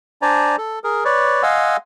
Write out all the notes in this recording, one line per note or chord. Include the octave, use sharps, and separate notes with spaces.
D4 C5 D5 G#5 A#5
A4
G#4 A#4
B4 C#5 D5
D#5 F5 F#5 G#5 C6 E6